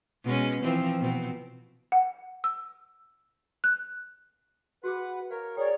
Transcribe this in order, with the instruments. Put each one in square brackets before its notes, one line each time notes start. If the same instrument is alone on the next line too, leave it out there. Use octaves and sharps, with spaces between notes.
[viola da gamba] B2 G#3 C#4
E3 F3 C4
B2 C4
[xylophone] F#5
E6
F#6
[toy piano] F#4 G#4 D6 [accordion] B4 F#5
[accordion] A#4 C#5 [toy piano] F5
[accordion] G#4 A#4 [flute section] C#5 D5 [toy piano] G5